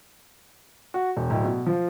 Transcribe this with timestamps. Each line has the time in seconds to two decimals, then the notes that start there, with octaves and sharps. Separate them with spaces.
0.94 F#4
1.17 E1
1.30 D1
1.44 B2
1.67 F3